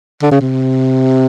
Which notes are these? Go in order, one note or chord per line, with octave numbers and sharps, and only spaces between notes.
D3
C#3
C3